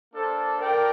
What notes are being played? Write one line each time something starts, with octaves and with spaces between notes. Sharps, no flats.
A#3 D4 A4 C5
F4 A4 A#4 D5 G5